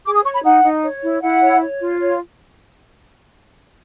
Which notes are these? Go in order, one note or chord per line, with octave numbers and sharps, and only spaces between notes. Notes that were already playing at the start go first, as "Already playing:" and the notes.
G#4 D6
D#6
C#5 C#6
B5
D#4 F#5
D#4
C#5
E4
E4 F#5
C#5
C#5
F4
C#5